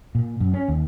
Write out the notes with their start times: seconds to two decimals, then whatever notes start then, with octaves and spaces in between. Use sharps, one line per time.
0.15 A#2
0.40 F#2
0.54 C#4
0.68 D#2